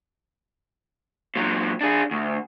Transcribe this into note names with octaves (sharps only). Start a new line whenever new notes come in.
A#2 F#3
D4 G#4
D2